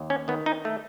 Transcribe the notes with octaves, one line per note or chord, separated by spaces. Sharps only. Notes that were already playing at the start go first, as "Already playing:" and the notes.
Already playing: D#2
C#4
D#3 B3
D#4
A3